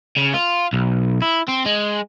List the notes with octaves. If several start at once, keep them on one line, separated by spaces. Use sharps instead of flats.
C#3
F4
B1
E4
C4
G#3